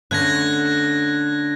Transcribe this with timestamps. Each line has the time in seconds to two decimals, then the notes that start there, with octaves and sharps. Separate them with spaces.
0.11 D3 A3 C#4 F#6 G#6 A#6